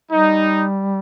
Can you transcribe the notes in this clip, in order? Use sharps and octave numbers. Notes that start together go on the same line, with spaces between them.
G3 D#4